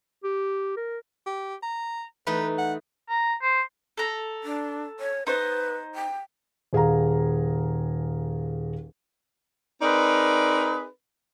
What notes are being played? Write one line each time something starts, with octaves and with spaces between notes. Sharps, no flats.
G4
A#4
G4
A#5
E3 A3 D#4 B4
F#5
A#5
C5
A4 A#5
D4
C#5
D#4 B4 C5
G5
D#1 G#4 F5 A#5
C4 D#4 G#4 A#4 B4 D5